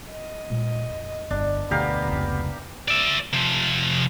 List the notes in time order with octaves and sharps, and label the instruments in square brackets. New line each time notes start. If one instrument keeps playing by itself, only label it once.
[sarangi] D#5
[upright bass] A#2 G#3
F2
[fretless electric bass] G1 [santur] D4
[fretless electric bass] D2 B2 [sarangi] B3 [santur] G4 A#4 F5
[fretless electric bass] F1 C#2
[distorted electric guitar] D5 E5
C3 F3